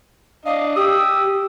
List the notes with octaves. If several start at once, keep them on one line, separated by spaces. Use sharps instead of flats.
D4 D#5 F5
G4 D#6 E6